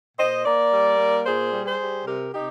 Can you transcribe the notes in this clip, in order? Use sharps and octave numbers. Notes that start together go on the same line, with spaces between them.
A#2 C5 D#5
A#3 A#4 D5
G3
A#3
A#2 G#4 C5
G3
G#4 C5
G3
C3 G4 A#4
C3 D#4 G4